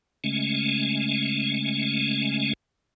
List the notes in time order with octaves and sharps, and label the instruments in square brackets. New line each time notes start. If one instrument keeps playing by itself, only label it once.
[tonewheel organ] C#3 G#3 A3 C#4